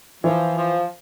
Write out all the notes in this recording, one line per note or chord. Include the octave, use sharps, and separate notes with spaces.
E3 F3
F3